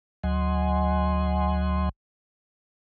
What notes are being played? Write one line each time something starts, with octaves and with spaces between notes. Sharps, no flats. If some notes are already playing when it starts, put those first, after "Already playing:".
D2 F#3 D#5 F#5 G#5 C6